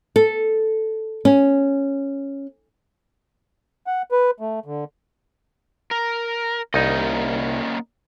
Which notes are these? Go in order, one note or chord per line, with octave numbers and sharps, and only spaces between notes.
A4
C#4
F#5
B4
A3
D3
A#4
C2 A#3 C#4 D#4 D#5